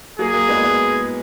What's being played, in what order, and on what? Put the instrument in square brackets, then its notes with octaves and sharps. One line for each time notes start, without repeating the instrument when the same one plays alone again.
[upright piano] F#3 A#3 [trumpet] G#4
[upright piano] F#3 A#3
G#3 B3
G#3 B3